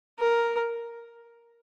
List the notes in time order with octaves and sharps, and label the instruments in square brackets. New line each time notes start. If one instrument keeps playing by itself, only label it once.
[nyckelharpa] A#4